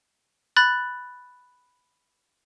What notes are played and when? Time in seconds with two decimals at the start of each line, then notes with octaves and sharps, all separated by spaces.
0.56 B5 F#6 A6